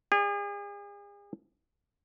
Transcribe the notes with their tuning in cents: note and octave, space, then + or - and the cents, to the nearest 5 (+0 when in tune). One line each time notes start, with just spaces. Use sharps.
G#4 -40 D5 +0